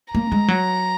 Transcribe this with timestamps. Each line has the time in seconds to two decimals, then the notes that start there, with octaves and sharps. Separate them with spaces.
0.14 A#3 A#5
0.32 G#3
0.48 F#3